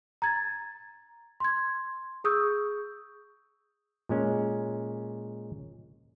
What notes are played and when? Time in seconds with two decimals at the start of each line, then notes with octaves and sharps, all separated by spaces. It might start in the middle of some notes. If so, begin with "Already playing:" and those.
0.22 A#5 G#6 A6
1.40 C6 G#6
2.24 G#4 C#6 D#6 E6 G6
4.09 A#2 G#3 C#4